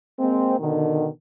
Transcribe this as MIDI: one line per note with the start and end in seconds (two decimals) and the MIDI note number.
0.18 0.57 56
0.18 0.57 58
0.18 0.57 60
0.59 1.08 47
0.59 1.08 50
0.59 1.08 51